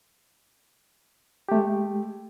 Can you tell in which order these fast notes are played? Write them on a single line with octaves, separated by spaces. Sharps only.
G4 A3 G#3